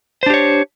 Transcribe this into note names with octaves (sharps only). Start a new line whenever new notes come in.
D4 G4 C5 C#5